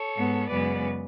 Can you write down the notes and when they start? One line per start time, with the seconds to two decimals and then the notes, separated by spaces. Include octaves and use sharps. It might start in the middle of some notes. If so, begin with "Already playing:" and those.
Already playing: A4 C#5
0.16 G#2 G#3 B3
0.50 F#2 C#3 G#3 B3 B4 D5